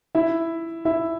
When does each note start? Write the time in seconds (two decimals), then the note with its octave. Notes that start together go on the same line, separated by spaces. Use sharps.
0.15 E4 E5
0.85 E4 E5